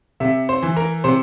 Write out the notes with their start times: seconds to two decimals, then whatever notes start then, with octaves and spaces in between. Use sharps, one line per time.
0.20 C3 E5
0.49 C5
0.62 E3
0.77 A#4
1.04 C3 C5